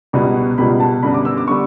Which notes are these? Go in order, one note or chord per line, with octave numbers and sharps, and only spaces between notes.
C#2 B2 G3 B3
C#2 B2 G3 B3 B5
A5
F#2 D3 G3 B3 B5
D6
E6
D6
D3 G3 B3 C#6